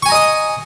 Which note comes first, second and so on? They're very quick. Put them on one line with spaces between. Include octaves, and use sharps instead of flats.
C#6 G#5 A#5 D#5 D#6